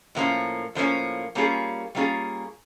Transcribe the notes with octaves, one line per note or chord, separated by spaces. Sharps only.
A2 F3 A#3 C#4
A2 F3 A#3 C#4
G3 A#3 C#4 F4 G#4
G3 A#3 C#4 F4 G#4